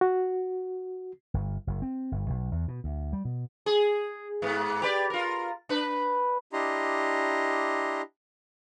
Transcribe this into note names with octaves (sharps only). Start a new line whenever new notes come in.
F#4
G1
F#1
C4
G1
B1
E2
B2
D2
G3
B2
G#4
G#2 B3
G4 B4 D5
F4 A#4
D4 B4
D4 E4 G4 D#5 A#5 C6